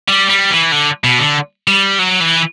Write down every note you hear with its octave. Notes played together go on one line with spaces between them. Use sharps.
G3
G3
E3
D3
B2
D3
G3
F#3
E3